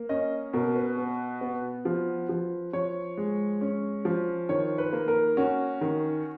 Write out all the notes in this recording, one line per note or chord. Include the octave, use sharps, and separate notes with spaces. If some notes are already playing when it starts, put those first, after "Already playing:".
Already playing: A#3
C#4 D#5
B2 A#4
B4
B3
B3
F3
F3
F3 C#5
G#3
C#4
F3
D#3 C#5
B4
A#3
A#4
C#4 F#4
D#3